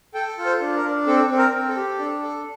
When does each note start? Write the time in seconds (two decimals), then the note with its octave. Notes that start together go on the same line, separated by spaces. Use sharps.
0.14 A4 G5
0.38 F4
0.45 C5
0.61 D4
0.76 A#4
0.84 D4
1.07 C4 A4
1.30 C4
1.38 A#4
1.53 C4
1.69 A4
1.76 G4
1.99 D4
2.23 A4